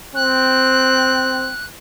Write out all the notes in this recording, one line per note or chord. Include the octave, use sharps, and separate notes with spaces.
C4 F#6